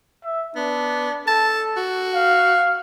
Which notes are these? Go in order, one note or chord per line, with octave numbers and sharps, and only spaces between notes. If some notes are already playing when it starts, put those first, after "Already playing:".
E5
B3 D4
A4 A5
F#4
F5